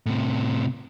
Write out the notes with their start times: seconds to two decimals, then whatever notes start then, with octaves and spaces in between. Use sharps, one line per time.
0.06 A2 C3